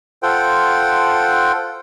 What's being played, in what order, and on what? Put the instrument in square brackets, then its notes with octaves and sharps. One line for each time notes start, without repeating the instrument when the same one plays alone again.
[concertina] F4 A4 C5 F#5 G5